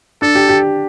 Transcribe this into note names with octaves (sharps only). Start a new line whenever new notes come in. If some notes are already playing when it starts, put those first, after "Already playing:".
D4 A4
G4
G4